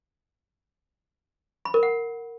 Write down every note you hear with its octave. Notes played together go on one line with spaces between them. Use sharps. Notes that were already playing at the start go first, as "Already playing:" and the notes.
B5
A#4
F#5